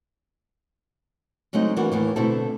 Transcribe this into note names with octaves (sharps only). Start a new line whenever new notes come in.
C#3 F#3 G#3 A3 C4 D#4
E3 A#3 D4 F#4
D#2 A2 E3
B2 D3 A3 C4 E4 A4